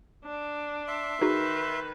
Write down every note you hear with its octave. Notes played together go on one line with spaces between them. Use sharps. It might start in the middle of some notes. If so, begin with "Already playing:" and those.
D4
E5 C6
D#3 D#4 F#4 G#4 B4